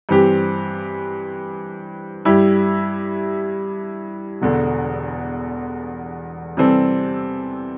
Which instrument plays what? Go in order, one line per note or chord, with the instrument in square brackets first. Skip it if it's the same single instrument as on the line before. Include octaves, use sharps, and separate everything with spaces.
[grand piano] G2 E3 C4 G4
G2 G3 E4 G4
E1 E2 D3
C3 E3 G3 C4 A4